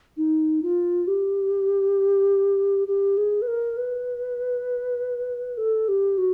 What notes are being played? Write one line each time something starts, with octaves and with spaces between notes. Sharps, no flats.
D#4
F4
G4
G4
G#4
B4
A#4
B4
A4
G4
F#4